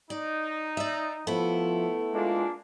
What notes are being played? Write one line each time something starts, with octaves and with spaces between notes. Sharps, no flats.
D#4 D5
D5 E5
F3 A3 B3 E4
G#3 A#3 D4 F4